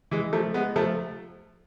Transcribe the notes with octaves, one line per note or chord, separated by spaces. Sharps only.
E3 G#3
F3 A3
G#3 B3
F3 A3